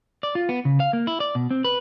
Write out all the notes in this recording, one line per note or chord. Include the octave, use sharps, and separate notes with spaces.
D5
F4
B3
C#3
F5
A#3
E4
D5
B2
C4
B4